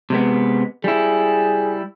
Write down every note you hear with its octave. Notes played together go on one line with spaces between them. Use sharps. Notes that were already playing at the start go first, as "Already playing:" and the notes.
C3 G#3 B3
G3 E4 G#4